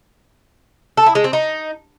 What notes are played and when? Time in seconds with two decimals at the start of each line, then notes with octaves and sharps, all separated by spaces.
0.97 A4
1.06 E4
1.15 G#3
1.24 C4
1.33 D#4